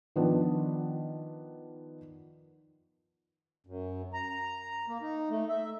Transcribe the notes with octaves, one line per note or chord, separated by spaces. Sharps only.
D#3 F3 B3 D4
F#2
A#5
A#3
D#4
A3
E5